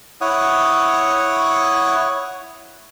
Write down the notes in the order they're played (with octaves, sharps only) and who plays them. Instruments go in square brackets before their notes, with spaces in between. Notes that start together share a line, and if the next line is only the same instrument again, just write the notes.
[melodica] E4 C#5 F#5 D#6